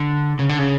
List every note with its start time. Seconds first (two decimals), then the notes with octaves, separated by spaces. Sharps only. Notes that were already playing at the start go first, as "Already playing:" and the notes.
Already playing: D3
0.39 C#3
0.49 D3
0.59 C#3